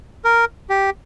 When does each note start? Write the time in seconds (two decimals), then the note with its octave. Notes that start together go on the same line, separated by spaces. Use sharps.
0.25 A#4
0.70 G4